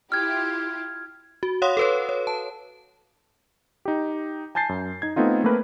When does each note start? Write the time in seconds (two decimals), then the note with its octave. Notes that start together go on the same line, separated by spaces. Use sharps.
0.12 E4 F4 G4 F6 G#6
1.43 F#4
1.62 C#5 F5 F#5 C6 D#6
1.77 A4 B4 C#5
2.09 C#5
2.27 A5
3.85 D#4 G4
4.55 G#5 A5 G6 A6 C7
4.69 F#2
5.02 D#4 G#6
5.16 A3 B3 C4 D#4 F4
5.44 A3 A#3 C4 A#4 B4